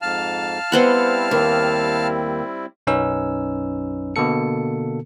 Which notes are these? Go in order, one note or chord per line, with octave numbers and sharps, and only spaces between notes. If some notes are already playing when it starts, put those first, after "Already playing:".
F2 G#2 F5 A5 F6
G3 B3 C4 E4 C5 F#5
D#2
B1 F#2 C#4 D#4 B4 E6
B2 D3 A#3 A4 C#7